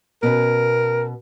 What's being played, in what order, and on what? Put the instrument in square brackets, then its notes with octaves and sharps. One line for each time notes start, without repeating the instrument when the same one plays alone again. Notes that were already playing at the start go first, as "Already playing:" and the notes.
[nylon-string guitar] B2 C#4 B4 [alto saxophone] A#4